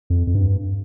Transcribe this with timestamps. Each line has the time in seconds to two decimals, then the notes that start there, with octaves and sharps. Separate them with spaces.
0.10 F2
0.27 F2
0.35 G2